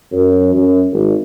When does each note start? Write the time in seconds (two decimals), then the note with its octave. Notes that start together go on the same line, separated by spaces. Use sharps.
0.11 F#2
0.54 F#2
0.92 G#1